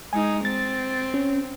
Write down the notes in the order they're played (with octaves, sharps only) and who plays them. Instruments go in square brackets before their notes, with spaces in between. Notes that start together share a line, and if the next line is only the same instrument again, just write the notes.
[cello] G#3 D#4 [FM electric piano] G#5
[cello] C4 [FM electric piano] A6
[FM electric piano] C#4